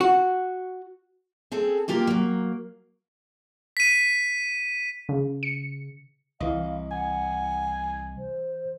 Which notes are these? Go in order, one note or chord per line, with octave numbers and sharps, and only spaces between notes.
F#4
C4 G#4 A4
C3 A#3 F4 G4 A#4
F#3 A#3
B6 D#7
C#3
C#7
C2 E3 D#5 F5
F#5 G#5
C5